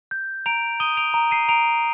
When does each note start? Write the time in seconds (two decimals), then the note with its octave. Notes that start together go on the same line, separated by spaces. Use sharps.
0.11 G6
0.46 A#5 D7 F7
0.80 D#6 D#7 G7
0.97 D7 F7
1.14 A#5
1.31 C7 D#7
1.49 A#5 D7 F7